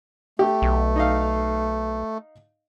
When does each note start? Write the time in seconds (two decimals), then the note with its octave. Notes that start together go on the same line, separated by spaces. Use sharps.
0.39 A3 G4
0.62 B1
0.96 D#4 D#5 F5